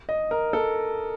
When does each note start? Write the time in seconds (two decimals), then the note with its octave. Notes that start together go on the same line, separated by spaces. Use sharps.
0.09 D#5
0.31 A#4
0.53 A4